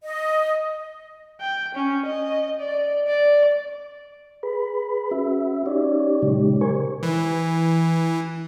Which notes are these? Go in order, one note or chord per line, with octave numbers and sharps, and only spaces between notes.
D#5
G5
C#4
D#5
D5
D5
G#4 B4 B5
C#4 F#4 E5
C#4 D#4 G4 C#5 D5
A#2 C#3 F#3 G#3 D#4 G4
A#4 C5 G#5 C#6
E3